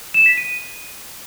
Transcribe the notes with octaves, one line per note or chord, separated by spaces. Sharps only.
E7
B6
D#7